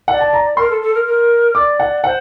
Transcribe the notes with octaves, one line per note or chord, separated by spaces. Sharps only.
D5 F#5
A5
A#5
A#4 C6
A4
A4
A#4
A#4
D5 D6
F#5
C5 F#5